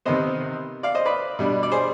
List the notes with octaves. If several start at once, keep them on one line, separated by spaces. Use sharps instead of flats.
C3 D#3 B3 C5 D#5
D5 F5
C5 D#5
B4 D5
B2 G3 D4
D5
G#4 C5